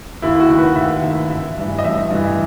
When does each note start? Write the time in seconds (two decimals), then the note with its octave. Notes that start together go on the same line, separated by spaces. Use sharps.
0.22 D#2 E4
0.40 F#4
0.50 D#3
0.58 B4
0.76 D#2 E5
1.03 D#3 E5
1.30 A1 E5
1.58 G2 E3
1.79 D#5
1.84 A1 E5
2.11 G2 E3